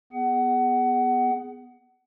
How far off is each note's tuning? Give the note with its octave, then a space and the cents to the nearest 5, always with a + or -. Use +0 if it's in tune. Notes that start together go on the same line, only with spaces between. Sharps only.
B3 +0 G#4 +0 F#5 +20